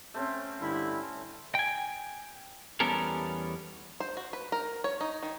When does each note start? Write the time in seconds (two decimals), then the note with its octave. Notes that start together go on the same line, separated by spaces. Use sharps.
0.14 A3 C4 C#4
0.60 G2 D3 E4
1.55 G5 G#5
2.80 E2 G3 B3 C#4 A4 A#4
4.00 C5
4.17 F#4
4.33 B4
4.52 A#4
4.84 C#5
5.01 D#4
5.23 D#3